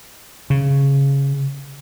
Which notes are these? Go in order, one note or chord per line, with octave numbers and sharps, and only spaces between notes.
C#3